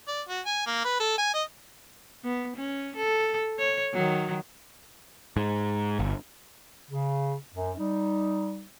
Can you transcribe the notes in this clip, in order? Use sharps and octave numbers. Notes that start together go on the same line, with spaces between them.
D5
F#4
G#5
A#3
B4
A4
G#5
D#5
B3
C#4
A4
C#5
D#3 F#3
G#2
G1
C#3
F#2
G3 D#4